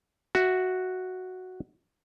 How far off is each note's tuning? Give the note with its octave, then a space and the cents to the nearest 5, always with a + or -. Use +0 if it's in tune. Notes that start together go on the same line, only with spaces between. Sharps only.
F#4 +0 E5 +0